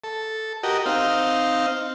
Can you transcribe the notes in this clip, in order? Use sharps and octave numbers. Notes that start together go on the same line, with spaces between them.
A4
F#4 G4 A#4 D#5
C4 D#4 F5